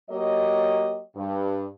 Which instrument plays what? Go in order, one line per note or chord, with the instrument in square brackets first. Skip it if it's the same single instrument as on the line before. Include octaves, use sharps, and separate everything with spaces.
[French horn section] F#3 A#3 G4 C#5 D#5
G2